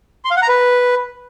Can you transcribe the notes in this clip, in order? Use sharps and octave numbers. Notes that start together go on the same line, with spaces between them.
C6
F5
F#5
A#5
B4